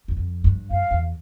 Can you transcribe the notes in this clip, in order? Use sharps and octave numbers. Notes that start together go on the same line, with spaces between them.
E2
F2
G2
F#2 F5
E2